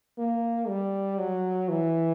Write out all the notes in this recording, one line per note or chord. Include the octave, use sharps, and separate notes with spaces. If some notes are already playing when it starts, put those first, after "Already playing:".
A#3
G3
F#3
E3